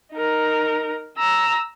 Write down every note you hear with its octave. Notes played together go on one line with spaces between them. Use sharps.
D#4 A#4
A#5 E6